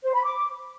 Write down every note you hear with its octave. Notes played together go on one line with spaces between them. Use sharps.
C5
B5
D6